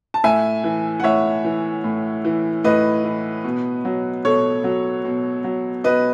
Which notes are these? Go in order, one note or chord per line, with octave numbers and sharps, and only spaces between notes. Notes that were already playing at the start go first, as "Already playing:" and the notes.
A5
A2 E5 G#5
E3
F#5
A2 C#5 E5
E3
A2
E3
A2 B4 D#5
E3
B2
F#3
B2 A4 C#5
F#3
B2
F#3
B2 B4 D#5